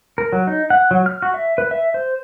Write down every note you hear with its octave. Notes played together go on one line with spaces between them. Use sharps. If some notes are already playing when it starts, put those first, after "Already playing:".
A#4
F#3
D#4
F#5
F#3
F6
F#4
E5
B4
E5
C5